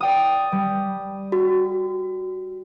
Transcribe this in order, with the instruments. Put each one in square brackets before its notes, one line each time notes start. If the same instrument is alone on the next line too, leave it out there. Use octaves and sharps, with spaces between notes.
[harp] D5 G5 D#6
G3
[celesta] F#4